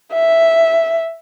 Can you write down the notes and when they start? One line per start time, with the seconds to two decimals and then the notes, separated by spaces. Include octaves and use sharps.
0.12 E5